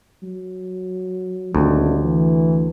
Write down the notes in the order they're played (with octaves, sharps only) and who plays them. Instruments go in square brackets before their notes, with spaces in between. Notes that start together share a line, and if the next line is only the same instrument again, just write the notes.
[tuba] F#3
[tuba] D#1 [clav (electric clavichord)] D2
[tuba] E3